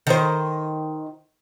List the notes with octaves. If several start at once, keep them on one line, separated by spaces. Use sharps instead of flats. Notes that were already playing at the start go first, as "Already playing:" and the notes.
D#3 C5